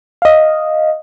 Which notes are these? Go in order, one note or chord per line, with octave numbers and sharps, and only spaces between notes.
D#5 F5